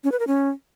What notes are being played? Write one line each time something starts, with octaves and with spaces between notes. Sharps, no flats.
C#4
B4
A#4
C#4